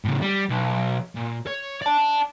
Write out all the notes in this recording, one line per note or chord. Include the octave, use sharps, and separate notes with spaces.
A2 C#3
G3
B1
A#2
C#5
D5 A5